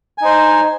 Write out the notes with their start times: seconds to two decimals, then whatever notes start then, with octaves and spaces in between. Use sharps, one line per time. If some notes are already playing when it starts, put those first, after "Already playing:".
0.18 G#5
0.21 D#4
0.25 C5